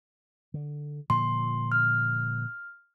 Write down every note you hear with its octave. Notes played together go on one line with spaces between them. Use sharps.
D3
A#2 D3 F3 C6
F6